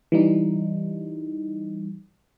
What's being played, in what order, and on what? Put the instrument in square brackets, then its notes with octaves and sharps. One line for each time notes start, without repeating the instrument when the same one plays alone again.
[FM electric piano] E3 G3 D#4